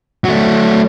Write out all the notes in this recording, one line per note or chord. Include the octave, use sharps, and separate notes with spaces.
F#3 A3